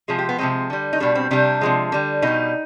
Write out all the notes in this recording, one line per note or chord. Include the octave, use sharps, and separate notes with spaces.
C3 F3 G#3 G#4
G4
B3
C3 F3 G#3 C4
D3 G3
D#4
B2 G3 D4
C4
C3 G3 D4
C3 F3 G#3
D3 G3
B2 G3 D#4